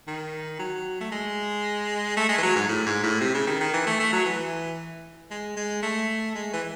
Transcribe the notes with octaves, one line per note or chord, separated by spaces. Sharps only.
D#3
F#3
A3
G#3
A3
G#3
E3
F#3
G#2
A2
G#2
A2
C3
C#3
D#3
D#3
E3
A3
A3
F#3
E3
G#3
G#3
A3
G#3
E3